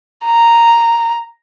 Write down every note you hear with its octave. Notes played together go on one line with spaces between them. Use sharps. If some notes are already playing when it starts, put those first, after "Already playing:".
A#5